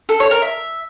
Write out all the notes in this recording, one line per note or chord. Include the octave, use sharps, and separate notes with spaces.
A4
C#5
A#4
E5